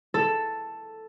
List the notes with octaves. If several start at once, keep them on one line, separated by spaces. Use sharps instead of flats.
A4